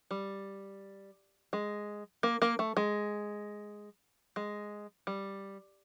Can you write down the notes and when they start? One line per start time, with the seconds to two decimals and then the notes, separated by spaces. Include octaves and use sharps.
0.11 G3
1.53 G#3
2.23 A#3
2.42 A#3
2.59 A3
2.77 G#3
4.36 G#3
5.07 G3